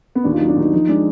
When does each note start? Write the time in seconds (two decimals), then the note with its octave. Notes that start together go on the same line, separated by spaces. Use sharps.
0.15 B3
0.24 D#2 D4
0.33 F4
0.37 D#4
0.41 F#3
0.48 D4
0.57 D#2 D#4
0.73 F3 D#4
0.88 G#3 D4